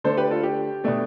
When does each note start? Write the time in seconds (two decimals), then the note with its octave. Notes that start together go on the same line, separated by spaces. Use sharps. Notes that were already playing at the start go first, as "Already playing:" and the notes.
0.04 D3 A3 D4 A4 C5
0.17 G4 B4
0.31 F4 A4
0.43 G4
0.84 B2 A3 D4